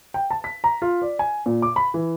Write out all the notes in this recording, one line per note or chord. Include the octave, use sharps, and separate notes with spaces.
G5
A5
B6
A#5
F4
D5
G#5
A#2
D6
B5
E3